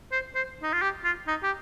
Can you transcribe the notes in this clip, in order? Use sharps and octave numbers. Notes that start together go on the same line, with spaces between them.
C5
C5
D#4
F4
G4
F4
D#4
G4